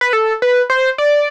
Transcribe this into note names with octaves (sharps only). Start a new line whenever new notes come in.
B4
A4
B4
C5
D5